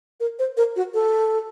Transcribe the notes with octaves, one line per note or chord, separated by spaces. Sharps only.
A#4
C5
A#4
F#4
A4